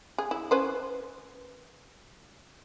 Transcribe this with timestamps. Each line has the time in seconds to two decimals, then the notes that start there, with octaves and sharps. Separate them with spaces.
0.18 G#4
0.31 E4
0.51 C#4 B4 C5